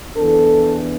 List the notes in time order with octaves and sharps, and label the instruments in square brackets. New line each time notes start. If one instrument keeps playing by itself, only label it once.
[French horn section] E2 E3 B3 D4 A4